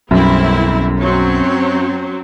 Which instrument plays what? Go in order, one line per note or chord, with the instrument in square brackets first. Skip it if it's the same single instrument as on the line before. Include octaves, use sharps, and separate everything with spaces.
[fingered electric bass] B1 [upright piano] F#2 [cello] G3 [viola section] C4 E4
[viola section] F#3 C4 [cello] C#4 C#5